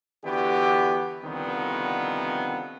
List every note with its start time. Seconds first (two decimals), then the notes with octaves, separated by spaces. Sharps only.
0.24 D3 E3 B3 F#4 G4
1.24 C2 D3 D#3 F3 B3 C4